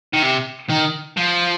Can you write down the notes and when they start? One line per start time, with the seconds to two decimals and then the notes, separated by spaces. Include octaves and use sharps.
0.14 D#3
0.23 C3
0.69 D#3
1.17 F3